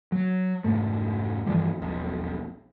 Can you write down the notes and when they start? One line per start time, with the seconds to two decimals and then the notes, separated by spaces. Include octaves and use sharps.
0.12 F#3
0.64 F1 F2 G#2 A3
1.46 G2 E3 F3 G3
1.81 E1 B1 F2